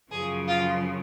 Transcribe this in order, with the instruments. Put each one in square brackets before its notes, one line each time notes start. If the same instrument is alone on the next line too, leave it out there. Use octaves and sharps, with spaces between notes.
[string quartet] F#2 C#3 F3 G#4
F4